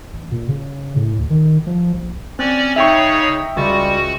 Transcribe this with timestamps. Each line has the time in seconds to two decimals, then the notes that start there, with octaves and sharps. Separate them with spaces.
0.13 A1
0.32 A#2
0.48 C#3
0.96 A2
1.18 D2
1.30 D#3
1.67 F3
1.94 A#1
2.39 C4 C#4 D5 D6 F#6
2.76 C#3 D#4 C#5 E5 G5 C#6
3.57 C#2 G3 F#4 A6